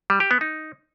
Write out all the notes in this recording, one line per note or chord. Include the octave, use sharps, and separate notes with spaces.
G3
G4
B3
D#4